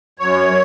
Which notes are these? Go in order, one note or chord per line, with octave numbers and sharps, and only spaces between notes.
F#2 C#5